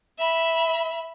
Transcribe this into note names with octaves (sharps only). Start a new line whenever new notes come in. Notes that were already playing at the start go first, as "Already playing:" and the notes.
E5 B5